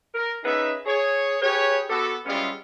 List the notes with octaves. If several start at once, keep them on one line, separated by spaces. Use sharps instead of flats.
A#4
C#4 D#4 G#4 B4 E5
G#4 C#5
G4 G#4 B4 C#5
B3 F#4 G4 A4
G3 G#3 B3 C#4 E4 F4